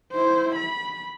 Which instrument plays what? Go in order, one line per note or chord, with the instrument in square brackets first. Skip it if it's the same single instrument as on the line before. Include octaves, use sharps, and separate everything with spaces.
[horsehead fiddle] E4 C5
B5